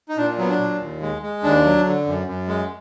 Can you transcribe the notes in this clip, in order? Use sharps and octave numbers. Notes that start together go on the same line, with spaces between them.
D#4
A#2 D4
F#3 B3
D4
A#2
D#2
G#3
G#3
D#2 D4
F#3
D3
F#2
F#2
G#3